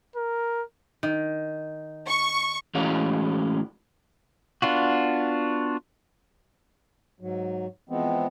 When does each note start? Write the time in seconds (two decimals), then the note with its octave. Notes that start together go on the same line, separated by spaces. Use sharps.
0.16 A#4
1.03 D#3
2.07 C#6
2.74 A2 E3 G#3 C#4 F#4 F5
4.62 B3 D4 F4 F#4
7.20 G#2 F#3
7.89 E3 F3 G#3 B3 C4